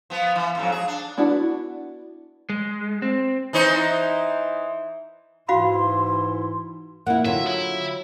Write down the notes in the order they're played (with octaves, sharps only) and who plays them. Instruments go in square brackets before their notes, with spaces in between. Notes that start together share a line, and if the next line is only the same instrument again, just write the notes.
[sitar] F3 B3
E3
F2 G#2 F#3
G#4
D4
[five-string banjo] B3 D4 E4 F#4
[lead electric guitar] G#3
C4
[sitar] E3 D#4 C5
[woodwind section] G#2 E3 E4 [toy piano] F#4 F5 B5 [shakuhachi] C6
[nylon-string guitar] A#2 E4 [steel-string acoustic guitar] A#3 [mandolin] F#5
[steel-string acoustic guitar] D3 C#4 G4 [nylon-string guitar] F#3 F4 C#5 [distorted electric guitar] E5
[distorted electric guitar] E4